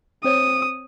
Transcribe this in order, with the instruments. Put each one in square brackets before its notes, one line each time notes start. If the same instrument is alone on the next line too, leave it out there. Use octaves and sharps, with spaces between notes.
[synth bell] C4 C5 C#5 [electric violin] D#6